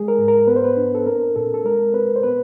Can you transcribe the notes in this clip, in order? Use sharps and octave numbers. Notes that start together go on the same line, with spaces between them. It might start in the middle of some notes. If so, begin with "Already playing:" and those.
Already playing: G#3 G#4
A#4
G#2
A#4
B3 B4
C5
B4
D4
A4
C4 A#4
A#2 A4
A4
G#3 A#4
C4 B4
C5
B3 B4